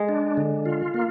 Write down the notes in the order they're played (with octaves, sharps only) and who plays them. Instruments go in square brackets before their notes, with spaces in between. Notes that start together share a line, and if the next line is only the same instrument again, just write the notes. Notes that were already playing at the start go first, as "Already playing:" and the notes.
Already playing: [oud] G#3
[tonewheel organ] D4
D3
F4
A#3